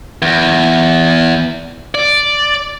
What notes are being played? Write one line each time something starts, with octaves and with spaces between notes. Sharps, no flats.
E2
D5